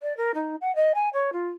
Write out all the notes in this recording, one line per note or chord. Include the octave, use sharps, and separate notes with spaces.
D5
A#4
D#4
F#5
D#5
G#5
C#5
F4